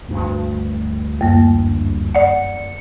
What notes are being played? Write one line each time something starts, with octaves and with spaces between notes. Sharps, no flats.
D2 G2
F#2 A#3
D5 F#5 C#7